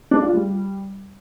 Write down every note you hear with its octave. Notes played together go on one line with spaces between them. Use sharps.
D4
F4
G3